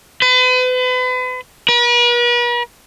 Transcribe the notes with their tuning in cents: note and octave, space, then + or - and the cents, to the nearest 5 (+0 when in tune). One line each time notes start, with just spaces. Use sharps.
B4 +40
B4 -45